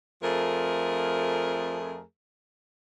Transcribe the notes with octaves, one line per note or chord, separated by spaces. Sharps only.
F2 F3 A3 G#4 A#4